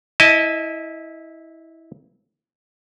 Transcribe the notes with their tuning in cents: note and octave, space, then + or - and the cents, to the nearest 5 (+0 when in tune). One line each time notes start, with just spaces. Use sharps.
E4 -15 D#5 +5 A5 -20